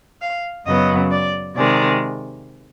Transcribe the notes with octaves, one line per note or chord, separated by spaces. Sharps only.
F5
F#2 C#3 F#3 B3 D#5
D5
C3 D#3 G#3 D5